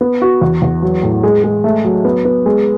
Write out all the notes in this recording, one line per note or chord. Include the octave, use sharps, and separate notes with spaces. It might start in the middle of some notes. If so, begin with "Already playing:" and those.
B3
F#4
E2
E2
F#3
A2
G#3
G#3
A3
F#3
B3
B3
G#3